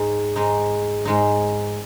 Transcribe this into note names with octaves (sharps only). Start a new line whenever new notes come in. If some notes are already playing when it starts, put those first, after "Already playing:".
Already playing: G#2 G#3 D#4
G#2 G#3 D#4
G#2 G#3 D#4